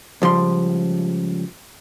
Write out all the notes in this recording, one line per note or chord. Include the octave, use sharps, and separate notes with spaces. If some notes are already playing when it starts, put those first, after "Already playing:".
C#2 F3 G3 C6